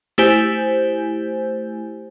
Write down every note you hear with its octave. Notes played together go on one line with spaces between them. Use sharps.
A3 E4 G4 C5 G#5 G6